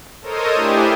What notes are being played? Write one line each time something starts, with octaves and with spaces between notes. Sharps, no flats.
A4 A#4 C5 C#5 D#5 D#6
A3 D4 E4 G4 C5 G#5